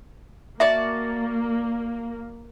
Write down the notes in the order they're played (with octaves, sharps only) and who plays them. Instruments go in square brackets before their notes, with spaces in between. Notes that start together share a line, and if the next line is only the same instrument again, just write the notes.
[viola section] A#3 [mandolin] F#4 D5 A5 [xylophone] E5